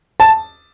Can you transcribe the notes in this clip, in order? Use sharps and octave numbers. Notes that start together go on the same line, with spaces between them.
A5